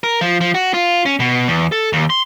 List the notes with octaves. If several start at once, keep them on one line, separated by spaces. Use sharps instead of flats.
A#4
F3
F3
F#4
F4
C#4
B2
E2
A4
D#2
C6